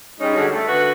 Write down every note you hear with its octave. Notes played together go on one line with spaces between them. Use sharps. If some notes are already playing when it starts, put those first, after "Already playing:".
G3 G#3 C#4 D#4
D3 G3 F#4 G#4
A3
D3 F#4 B4